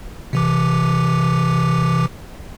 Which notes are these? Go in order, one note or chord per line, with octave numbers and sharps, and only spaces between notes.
C3 E3 D6